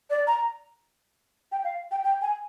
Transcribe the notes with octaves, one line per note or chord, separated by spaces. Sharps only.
D5
A#5
G5
F5
G5
G5
G#5